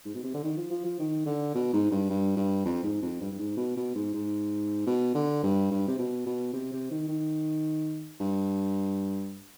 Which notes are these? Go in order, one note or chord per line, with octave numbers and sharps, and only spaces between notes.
G#2
B2
C3
D3
D#3
F3
F3
F3
D#3
D3
B2
G#2
G2
G2
G2
F2
G#2
F2
G2
G2
G#2
B2
B2
G#2
G#2
B2
D3
G2
G2
C3
B2
B2
C3
C3
D#3
D#3
G2